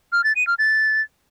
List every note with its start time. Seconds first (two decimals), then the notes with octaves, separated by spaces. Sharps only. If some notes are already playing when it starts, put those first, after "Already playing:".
0.13 F6
0.24 A6
0.36 D#7
0.47 F6
0.59 A6